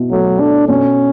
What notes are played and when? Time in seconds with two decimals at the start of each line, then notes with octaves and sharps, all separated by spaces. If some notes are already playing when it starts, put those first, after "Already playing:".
Already playing: B2 E4
0.11 F#3 A3
0.40 D4 A4
0.69 B2 C#4